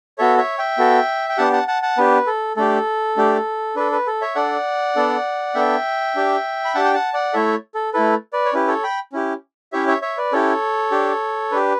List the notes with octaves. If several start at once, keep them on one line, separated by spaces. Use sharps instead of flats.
B3 F#4 A4 C#5 E5
C#5 E5
E5 G5
B3 F#4 A4
G5
B3 D4 G4 F#5 A5
F#5 A5
F#5 A5
F#5 A5
B3 D4 G4 B4
A4
A3 D4 G4 A4
A3 D4 G4
D4 A4 B4
B4
A4
C#5 E5
D4 A4 D5 F#5
B3 D4 A4
B3 D4 A4 E5 G5
D4 G4
B5
D4 G4 F#5 A5
G5
F#5 A5
D5 F#5
A3 E4 A4 C#5 E5
A4
A3 E4 A4 B4
B4 D5
C#5
C#4 E4 G4 B4
A4 C#5
G5 B5
C#4 E4 G4
C#4 E4 G4 C#5 E5
C#5 E5
C#5 E5
B4 D5
C#4 E4 G4 A4 C#5
D4 G4
D4 G4 B4